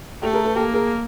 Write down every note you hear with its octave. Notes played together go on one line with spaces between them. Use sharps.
A3 G4 A4
G#4 A#4
A4 B4
A#3 G4 A4
G#4 A#4